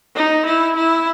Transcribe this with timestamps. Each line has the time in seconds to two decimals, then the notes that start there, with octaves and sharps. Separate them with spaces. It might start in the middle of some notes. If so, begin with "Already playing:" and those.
0.16 D#4
0.45 E4
0.76 E4